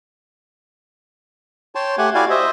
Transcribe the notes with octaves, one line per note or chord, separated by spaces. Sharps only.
C#5 G5 A5 C6
A3 G4 F#5 G#5
E4 F#4 G4 D5 F5 G#5
C5 D#5 E5